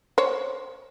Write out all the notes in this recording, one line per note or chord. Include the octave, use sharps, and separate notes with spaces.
C5 C#5